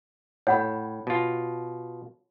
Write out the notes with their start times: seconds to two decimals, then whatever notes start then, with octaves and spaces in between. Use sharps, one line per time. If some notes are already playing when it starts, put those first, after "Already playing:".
0.47 A2 C#5 F#5 B5
1.07 B2 F4